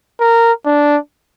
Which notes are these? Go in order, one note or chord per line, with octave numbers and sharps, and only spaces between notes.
A#4
D4